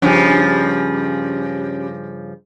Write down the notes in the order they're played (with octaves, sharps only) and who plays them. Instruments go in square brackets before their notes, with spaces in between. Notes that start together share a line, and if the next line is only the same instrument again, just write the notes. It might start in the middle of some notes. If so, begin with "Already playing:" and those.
[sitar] G2 C#3 F3 [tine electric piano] C#4 G4